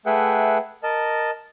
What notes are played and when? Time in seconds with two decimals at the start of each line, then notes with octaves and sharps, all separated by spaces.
0.06 A3 G#4 B4 E5 F#5 G5
0.83 A#4 D#5 A5